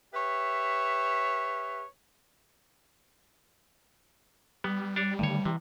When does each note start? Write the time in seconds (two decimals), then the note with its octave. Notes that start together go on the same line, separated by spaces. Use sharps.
0.14 G4 B4 C#5 E5
4.64 G3 B3
4.96 D4 C#5
5.19 G2 D3 D#3 A3 C#5
5.45 C3 E3